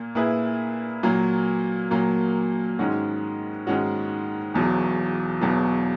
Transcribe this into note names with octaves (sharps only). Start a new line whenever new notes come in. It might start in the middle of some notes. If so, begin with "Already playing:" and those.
Already playing: A#2 A#3
A#2 A#3 E4 G#4 B4
A#2 F#3 A#3
A#2 F#3 A#3
G#2 D#3 G#3 C#4 F#4
G#2 D#3 G#3 C#4 F#4
E1 E2 B2 F#3
E1 E2 B2 F#3